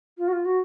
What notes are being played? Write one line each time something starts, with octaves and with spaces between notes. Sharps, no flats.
F4
F#4
F4
F#4